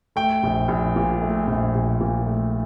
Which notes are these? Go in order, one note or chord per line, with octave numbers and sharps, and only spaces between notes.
A3 G5
A#1
A#1
A#2
A3
A#1
A#1
A#2
A3